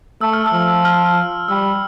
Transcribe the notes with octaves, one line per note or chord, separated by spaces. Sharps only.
A3 E6
F6
E6
F3
F6
G3 E6